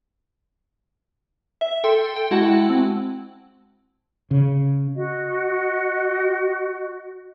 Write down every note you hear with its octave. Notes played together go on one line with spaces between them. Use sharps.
E5
A4 G5 C6
G5
G#3 E4 F#4 F#5 A5
C4
C#3
F#4 D#5